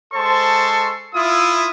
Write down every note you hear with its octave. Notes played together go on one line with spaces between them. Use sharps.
G#3 A4 C5 A5 C6 C#6
E4 F4 D#6